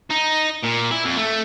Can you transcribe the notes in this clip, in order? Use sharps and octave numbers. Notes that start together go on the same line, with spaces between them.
D#4
A#2
E4
F2
A3